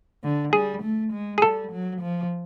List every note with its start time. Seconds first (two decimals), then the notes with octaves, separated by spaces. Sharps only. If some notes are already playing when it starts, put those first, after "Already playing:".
0.24 D3
0.53 G3 G#4
0.82 A3
1.13 G#3
1.38 G#4
1.42 G3 A4
1.72 F#3
2.01 F3